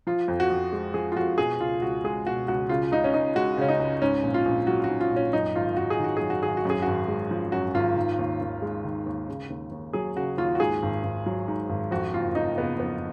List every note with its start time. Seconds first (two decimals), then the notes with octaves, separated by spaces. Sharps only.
0.07 F3 F4
0.28 F2
0.40 F#4
0.50 F2
0.73 G#3
0.94 F3 G#4
1.12 F4
1.16 F2 F#4
1.38 B2 G#4
1.60 C#2 F4
1.82 C#2 F#4
2.04 G#3 G#4
2.26 B2 F#4
2.48 C#2 F#4
2.69 C#3 F4
2.91 C#2 D#4
3.04 C#4
3.14 C#2 D#4
3.36 G#3 F#4
3.57 C#3 C#4
3.69 D#4
3.79 C#2
4.02 G#2 C#4
4.24 A#1
4.34 F4
4.45 A#1
4.67 F#3 F#4
4.84 F#4
4.89 G#2
5.00 F4
5.11 A#1
5.16 C#4
5.33 F#2 D#4
5.55 G#1 F4
5.77 G#1 F#4
5.90 G#4
5.99 D#3
6.04 F#4
6.17 F#2 G#4
6.30 F#4
6.43 G#1 G#4
6.57 F#4
6.65 F#2 G#4
6.82 G#1 F#4
7.08 G#3
7.31 F3
7.52 F#2 F#4
7.75 G#1 F4
7.96 D#3
8.19 D#2
8.41 D#2
8.62 G#3
8.85 D#3
9.06 D#2
9.28 C#3
9.50 D#2
9.72 D#2
9.93 F#3 G#4
10.16 C#3 F#4
10.38 D#2 F4
10.55 F#4
10.60 G#2 G#4
10.82 G#1
11.04 G#1
11.26 F#3
11.48 G#2
11.69 G#1
11.91 F2 F#4
12.13 F#1 F4
12.35 F#1 D#4
12.57 C#3 B3
12.80 F2 B3